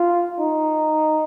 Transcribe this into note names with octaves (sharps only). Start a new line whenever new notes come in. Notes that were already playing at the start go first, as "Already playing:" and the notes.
Already playing: F4
D#4